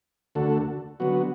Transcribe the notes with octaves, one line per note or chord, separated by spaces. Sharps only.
D2 D3 A3 F#4 A4
D3 F#3 B3 F#4